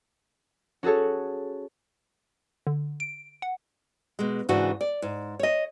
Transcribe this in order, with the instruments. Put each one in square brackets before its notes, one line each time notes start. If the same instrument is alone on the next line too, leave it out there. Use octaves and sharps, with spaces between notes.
[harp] C#4 F#4 G#4 A4 C#5
[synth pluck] D3
D7
F#5
[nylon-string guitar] B2 G#3
G#2 C#3 E3 D4 F#4
D5
G#2
C#5 D#5